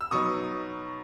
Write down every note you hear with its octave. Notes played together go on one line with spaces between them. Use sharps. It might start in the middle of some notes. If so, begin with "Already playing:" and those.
E6
B2 F#3 B3 D#4 C#6 D#6